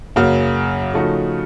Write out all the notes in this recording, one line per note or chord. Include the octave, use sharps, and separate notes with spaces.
F#2 C#3 F#3 A#3
C#3 F3 A3 D#4 F#4